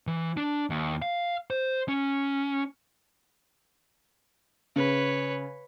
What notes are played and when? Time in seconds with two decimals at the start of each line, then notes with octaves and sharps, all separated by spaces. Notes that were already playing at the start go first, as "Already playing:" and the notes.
0.07 E3
0.37 D4
0.70 D#2
1.02 F5
1.51 C5
1.89 C#4
4.76 C#3 B4 C#5